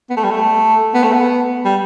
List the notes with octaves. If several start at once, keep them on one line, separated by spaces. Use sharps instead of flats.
B3
A3
G3
A3
B3
A3
B3
G3